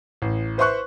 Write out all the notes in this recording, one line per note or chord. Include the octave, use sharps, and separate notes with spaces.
A1
B4 C5 E5 C6 C#6 F#6